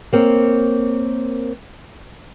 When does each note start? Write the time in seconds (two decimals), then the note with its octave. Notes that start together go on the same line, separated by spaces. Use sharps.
0.13 A#3 C4 C#5